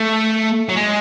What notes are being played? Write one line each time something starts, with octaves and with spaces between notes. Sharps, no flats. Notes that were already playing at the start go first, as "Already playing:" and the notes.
Already playing: A3
F#3
G#3